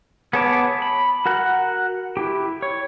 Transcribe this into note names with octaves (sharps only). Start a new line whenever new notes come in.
B3 G#4 C#5 A5 D6
B5
F#4 A#4 F#5
E4 G4
C#5